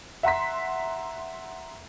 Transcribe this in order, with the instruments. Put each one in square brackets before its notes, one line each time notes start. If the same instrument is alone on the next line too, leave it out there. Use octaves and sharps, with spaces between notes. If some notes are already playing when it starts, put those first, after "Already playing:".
[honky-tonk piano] E5 F#5 A#5 C6 B6